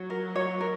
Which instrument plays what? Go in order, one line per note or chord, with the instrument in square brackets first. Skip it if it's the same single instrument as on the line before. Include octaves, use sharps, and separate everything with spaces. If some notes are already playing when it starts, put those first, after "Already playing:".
Already playing: [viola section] F#3 [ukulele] C#5
[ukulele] A#4
C#5
A#4